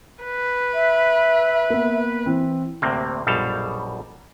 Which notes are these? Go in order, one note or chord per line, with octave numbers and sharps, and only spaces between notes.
B4
E5
A#3 B3
E3 C4
D2 A2 C3 A#3 C4
A#1 F#2 B2 G3 A4 F5